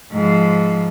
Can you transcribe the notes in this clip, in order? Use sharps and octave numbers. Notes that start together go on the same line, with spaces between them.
G#2 F3